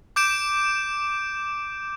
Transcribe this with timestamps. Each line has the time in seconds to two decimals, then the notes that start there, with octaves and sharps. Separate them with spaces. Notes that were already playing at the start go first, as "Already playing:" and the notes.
0.16 D6 G6 D7 E7